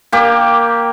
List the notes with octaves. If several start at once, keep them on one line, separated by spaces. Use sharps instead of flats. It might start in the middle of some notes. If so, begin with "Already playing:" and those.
A#3 G4